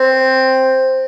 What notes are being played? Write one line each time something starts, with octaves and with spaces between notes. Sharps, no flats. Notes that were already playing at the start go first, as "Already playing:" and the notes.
Already playing: C4